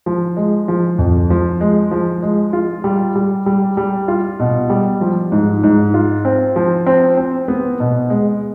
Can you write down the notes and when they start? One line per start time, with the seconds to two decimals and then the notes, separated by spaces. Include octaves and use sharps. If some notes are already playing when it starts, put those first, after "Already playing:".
0.06 F3
0.37 G#3
0.68 F3
0.98 F2
1.30 F3
1.61 G#3
1.91 F3
2.22 G#3
2.53 F4
2.84 G3
3.16 G3
3.46 G3
3.77 G3
4.08 F4
4.40 B2
4.70 G3
5.01 F3
5.32 G#2
5.64 G#2
5.94 F4
6.25 C4
6.56 F3
6.87 C4
7.17 C4
7.48 B3
7.80 B2
8.10 G#3